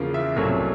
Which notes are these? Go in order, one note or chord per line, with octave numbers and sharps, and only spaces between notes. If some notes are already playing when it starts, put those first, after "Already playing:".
Already playing: E2 C#3 F3 A#3
E5
C2 A#2 F#3 A3